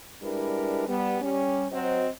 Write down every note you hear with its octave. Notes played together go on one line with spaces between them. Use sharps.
G3 G#3 D4 E4 A#4 B4
G3 B3
G3 C#4
F#3 C4 F#4 C5 D#5